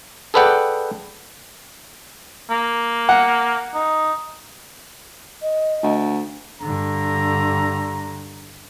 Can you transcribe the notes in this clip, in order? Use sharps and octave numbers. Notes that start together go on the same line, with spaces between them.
G#4 A4 B4 D5 F#5 G5
A#3
F#5
D#4
D#5
D2
G2 D3 A#5